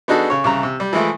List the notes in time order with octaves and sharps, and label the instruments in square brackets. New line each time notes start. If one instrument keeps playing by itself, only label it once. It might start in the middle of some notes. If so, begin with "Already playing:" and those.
[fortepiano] B3 D4 D#4 F#4 G#4 A4
C#3 C#5
C2 C#3 A#5
C3
G3
E3 F3 G#3 A3 E4